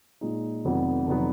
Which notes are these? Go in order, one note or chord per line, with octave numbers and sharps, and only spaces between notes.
A#2 G#3 D#4
F1 F2 D#3 F#3 B3
F1 D#3 F#3 B3